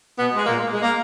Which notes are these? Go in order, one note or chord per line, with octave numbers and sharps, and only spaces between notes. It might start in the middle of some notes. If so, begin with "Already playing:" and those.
B2 B3
G#3
A#2 A#3
G#3
A#3